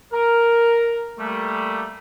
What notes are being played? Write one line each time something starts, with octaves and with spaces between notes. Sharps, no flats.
A#4
G3 A3 A#3